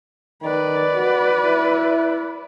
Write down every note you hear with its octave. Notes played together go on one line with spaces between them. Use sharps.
D#3 B4 D5
F#4
E4